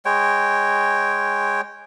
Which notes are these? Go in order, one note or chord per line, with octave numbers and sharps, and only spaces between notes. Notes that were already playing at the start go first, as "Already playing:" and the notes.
G#3 C#5 G5